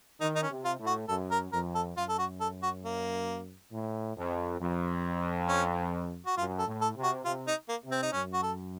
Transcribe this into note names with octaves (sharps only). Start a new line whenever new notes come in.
D#3 D#4
D#4
C#4
C3
F4
A2
F#4
F#2 A4
A#4
F2 A#4
A4
F#2 F4
A4
F#4
A4
F#4
A#3
A2
F2
F2
C#4
F#4
F#2 F4
A4
A2
A4
C3
F#4
C3 F4
D#4
A#3
C3
C4
D#4
F#2 C#4
F#4
A4